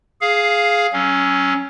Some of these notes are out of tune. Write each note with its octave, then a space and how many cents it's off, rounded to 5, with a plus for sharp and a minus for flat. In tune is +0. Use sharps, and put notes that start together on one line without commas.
G#4 +5 F5 +0
F#3 +20 C#4 +0